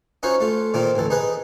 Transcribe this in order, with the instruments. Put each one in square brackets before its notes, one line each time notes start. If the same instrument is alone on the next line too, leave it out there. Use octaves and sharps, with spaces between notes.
[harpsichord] C#4 D#4 F4 F#4 C5 C#5
A3 F4
A#2 D#3 A#3 C4 F4
A1 D2 E3 A4
D#4 G#4 B4 D#5